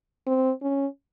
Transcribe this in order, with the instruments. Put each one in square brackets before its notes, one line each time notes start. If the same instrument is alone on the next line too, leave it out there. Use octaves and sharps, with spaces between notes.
[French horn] C4
C#4